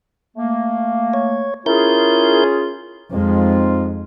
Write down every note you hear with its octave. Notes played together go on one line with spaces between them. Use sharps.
A3 A#3
C#5
C#4 E4 F4 G#4 A#4 G6
F2 G#3 C4 D#4 F4